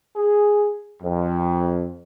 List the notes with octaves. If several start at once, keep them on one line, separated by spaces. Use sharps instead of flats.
G#4
F2